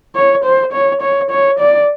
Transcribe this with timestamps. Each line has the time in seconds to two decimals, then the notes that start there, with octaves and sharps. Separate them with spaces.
0.15 C#5
0.44 C5
0.73 C#5
1.02 C#5
1.30 C#5
1.59 D5